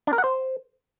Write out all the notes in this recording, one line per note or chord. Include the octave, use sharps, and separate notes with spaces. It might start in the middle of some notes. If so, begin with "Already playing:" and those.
D4
A#4
F#5
C5